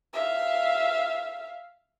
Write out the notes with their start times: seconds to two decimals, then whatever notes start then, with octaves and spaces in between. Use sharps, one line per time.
0.14 E5 F5